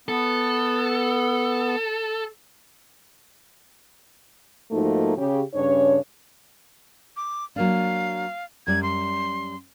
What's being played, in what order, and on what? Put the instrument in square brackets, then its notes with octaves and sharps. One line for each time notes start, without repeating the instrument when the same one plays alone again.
[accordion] B3 [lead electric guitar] A4
[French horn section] G#2 F3 A3 A#3 D#4 F#4
C#3 G4
G2 C#3 C#4 D4 C#5
[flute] D6
[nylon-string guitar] F#3 A#3 D4 [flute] F5
[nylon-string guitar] F#2 G3 D5 [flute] G#6
[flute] C6